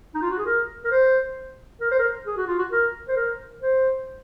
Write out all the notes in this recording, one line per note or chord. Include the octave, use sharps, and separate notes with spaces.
D#4
F4
F#4
G#4
A#4
A#4
C5
A#4
C5
A#4
G#4
F#4
F4
F#4
A#4
C5
A#4
C5